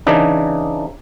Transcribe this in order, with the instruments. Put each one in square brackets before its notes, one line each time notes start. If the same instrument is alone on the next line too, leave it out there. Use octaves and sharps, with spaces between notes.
[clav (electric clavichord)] C#3 E3 D4 D#4